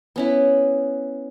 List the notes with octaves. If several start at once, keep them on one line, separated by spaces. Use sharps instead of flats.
B3 C#4 E4